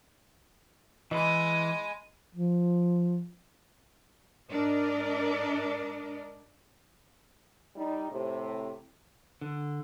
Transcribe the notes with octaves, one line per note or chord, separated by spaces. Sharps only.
E3 G#3 D#5 G#5 B5
F3
G#2 D4 A#4 D5 D#5
G3 D#4
A2 C3
D3